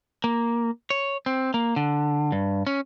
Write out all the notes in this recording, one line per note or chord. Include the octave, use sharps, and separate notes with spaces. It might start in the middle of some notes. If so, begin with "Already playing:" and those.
A#3
C#5
C4
A#3
D3
G2
C#4